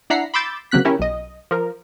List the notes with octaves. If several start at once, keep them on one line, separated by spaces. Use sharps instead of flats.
D4 E4 F#5 A#5 B6 C7
B5 C6 D6 E6 G6 A6
C#3 F#3 A#3 C4 F#6 B6
C#4 E4 G4 A#4
B1 D#5
F3 A#4